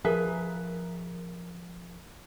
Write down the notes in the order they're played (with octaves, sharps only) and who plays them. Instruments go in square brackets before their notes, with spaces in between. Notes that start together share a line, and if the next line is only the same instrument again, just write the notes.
[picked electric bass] F3 [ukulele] G#4 B4 E5 [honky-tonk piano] A#4